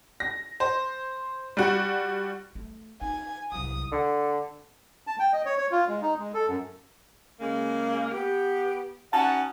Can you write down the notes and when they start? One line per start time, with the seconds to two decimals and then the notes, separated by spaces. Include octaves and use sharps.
0.20 A#6
0.60 C5
1.57 G3 F#4
2.55 A3
3.02 D#4 G#5
3.52 C2 F#2 D#6
3.92 D3
5.07 A5
5.19 G5
5.33 D#5
5.45 C#5
5.58 C#5
5.71 F4
5.88 G#3
6.02 D#4
6.19 G#3
6.34 A4
6.48 F#2
7.40 C#3 G#3 A#3
8.12 B3 G4
9.13 C#4 D#4 F#4 F#5 A5